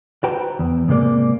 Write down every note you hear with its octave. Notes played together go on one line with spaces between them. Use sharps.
F#4 B4 C5 G5 A5 A#5
E2
G#2 C3 G#3 A#3 D5